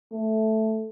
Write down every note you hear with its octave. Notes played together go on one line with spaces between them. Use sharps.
A3